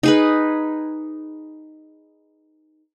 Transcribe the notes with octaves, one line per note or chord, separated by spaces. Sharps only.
D#4 G#4 B4